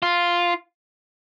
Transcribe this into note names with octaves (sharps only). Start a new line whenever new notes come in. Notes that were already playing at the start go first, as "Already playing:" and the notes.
F4